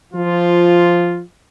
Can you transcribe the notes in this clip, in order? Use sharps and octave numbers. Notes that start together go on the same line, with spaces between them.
F3 F4